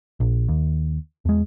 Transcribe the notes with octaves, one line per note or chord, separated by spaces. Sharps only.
A#1
D#2
E2 G#3